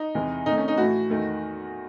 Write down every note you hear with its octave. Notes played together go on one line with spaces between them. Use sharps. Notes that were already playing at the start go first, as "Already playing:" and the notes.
Already playing: D#4
E2 C3 E3 G#3
C3 D#3 A3 D#4
C#4
D#4
A2 E3 A3 F#4
E2 D#3 A3